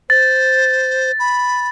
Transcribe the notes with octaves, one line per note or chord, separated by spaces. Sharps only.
C5 A6
B5